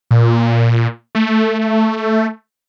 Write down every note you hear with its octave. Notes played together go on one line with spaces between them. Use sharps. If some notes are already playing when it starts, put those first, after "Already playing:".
A#2
A3